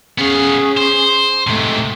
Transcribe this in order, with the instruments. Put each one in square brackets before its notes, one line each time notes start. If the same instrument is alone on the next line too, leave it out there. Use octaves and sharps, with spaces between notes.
[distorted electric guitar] B3 F5 [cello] C#4 G#4
[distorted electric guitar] C5
[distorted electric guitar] G#2 C3 [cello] A3